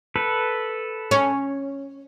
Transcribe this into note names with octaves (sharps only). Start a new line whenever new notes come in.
A4 B4
C#4